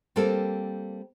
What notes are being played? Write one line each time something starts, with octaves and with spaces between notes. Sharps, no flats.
G3 A#3 C4 A4